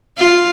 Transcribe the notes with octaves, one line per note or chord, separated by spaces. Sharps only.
F4